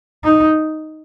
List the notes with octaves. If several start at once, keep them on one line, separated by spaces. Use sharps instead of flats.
D#4